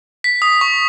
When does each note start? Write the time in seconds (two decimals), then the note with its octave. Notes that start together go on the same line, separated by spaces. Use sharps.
0.24 B6
0.42 D#6
0.61 C#6